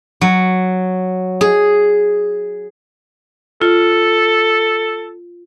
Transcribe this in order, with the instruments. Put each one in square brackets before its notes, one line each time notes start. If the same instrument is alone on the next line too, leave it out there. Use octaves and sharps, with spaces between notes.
[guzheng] F#3
G#4
[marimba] F4 [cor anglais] A4